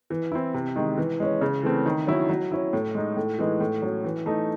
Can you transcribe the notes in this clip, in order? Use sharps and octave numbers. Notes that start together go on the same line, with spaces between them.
E3
C4 E4
C3
D#3 G#3
E3
G#3 C#4
C#3
E3 A3 C4
D#3
F#3 C#4 E4
F#3
C#4 E4
A2
G#3 D#4
A2
E3 G#3 D#4
A2
F#3 C#4
E3
A3 D#4